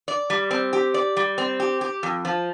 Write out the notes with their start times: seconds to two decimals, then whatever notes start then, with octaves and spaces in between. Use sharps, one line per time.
0.08 D5
0.30 G3
0.51 C4
0.73 G4
0.94 D5
1.17 G3
1.38 C4
1.60 G4
1.81 G4
2.03 F2
2.25 F3